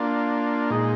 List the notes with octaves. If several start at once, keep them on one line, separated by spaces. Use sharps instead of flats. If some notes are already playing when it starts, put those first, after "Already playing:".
Already playing: A#3 D4 F4
A#2 G#3 D#4